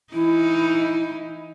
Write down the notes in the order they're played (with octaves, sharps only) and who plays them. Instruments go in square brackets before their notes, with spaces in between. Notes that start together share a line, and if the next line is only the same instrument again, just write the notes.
[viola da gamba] E3 D#4 [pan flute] E4